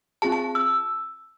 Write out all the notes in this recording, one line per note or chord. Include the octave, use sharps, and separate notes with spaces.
C4 F4 G#4 A5
A5
E6